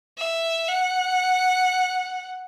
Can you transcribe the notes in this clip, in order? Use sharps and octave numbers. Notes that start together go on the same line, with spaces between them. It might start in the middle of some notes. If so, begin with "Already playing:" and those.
E5
F#5